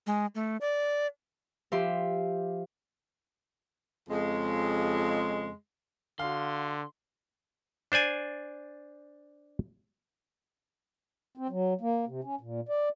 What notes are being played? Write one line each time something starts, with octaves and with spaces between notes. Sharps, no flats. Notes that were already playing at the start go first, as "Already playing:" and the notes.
G#3
A3
D5
F3 G4 E5 C6
F2 C#3 G#3
D3 F#4 F5 C6
D4 C5 D5 G#5
C4
F#3
A#3
C3
C#4
A#2
D5